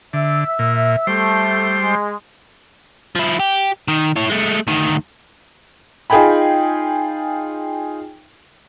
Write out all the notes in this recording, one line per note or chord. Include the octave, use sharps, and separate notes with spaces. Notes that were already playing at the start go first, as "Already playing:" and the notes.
D3 E5
A#2
G3 A3 C5
G#3
F3 E4
G4
D#3
E4 C#5
G#3 A3
D2 D#3
D#4 F4 G#4 G5 G#5 B5